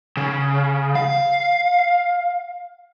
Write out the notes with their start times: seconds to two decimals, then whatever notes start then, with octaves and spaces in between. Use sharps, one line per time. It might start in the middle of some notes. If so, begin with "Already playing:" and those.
0.17 C#3
0.95 F5